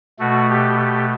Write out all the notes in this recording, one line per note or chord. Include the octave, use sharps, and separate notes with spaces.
B2 A3 F#4
G4
G4